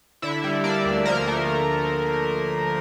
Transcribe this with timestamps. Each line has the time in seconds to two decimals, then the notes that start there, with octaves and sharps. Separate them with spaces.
0.22 D3 E4 E5
0.44 G3
0.64 A#3 D4 D5
0.85 D2
1.05 F3 A#3 A#4
1.27 A3